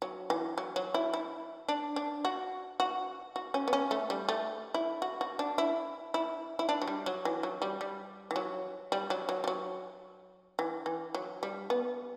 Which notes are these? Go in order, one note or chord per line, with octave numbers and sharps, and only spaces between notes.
F#3
E3
F#3
F#3
E4
E4
D4
D4
F#4
F#4
F#4
C#4
B3
C#4
A3
G3
A3
E4
F#4
F#4
D4
E4
E4
E4
D4
F#3
G3
F#3
E3
F#3
G3
G3
E3
F#3
G3
F#3
F#3
G3
F#3
E3
E3
F#3
G3
B3